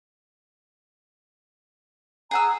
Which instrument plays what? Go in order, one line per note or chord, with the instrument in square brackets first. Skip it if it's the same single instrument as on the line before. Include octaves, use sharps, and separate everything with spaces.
[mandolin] G#4 F#5 E6 [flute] A#5